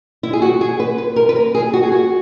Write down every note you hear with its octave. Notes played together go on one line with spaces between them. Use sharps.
E4
G#4
F#4
G#4
B4
B4
A#4
B4
A#4
G#4
F#4
G#4
F#4